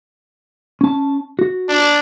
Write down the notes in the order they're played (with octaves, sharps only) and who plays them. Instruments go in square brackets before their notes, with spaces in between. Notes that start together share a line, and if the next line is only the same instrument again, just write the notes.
[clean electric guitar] C#4 A5
F#4
[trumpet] D4